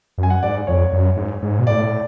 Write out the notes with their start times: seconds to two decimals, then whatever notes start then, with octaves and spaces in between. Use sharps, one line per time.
0.18 F#2
0.23 G#5
0.30 F#5
0.43 G#2 D5
0.67 F2 C#5
0.93 F#2
1.17 G#2
1.42 G#2
1.59 B2
1.66 A2 D5